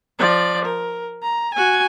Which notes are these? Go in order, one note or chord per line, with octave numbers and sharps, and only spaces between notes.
F3 D5
A#4
A#5
F#4 G#5